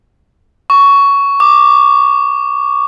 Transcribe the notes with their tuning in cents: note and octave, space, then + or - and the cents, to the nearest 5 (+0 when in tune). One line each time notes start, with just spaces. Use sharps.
C#6 +15
D6 +10